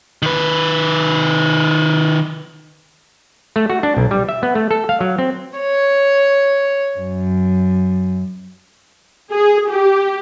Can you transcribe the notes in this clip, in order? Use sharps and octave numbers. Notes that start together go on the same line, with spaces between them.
D#3 B4
A3
F#4
D4
B1
G3
E5
B3
A3
A4
F5
F#3
C4
C#5
F#2
G#4
G4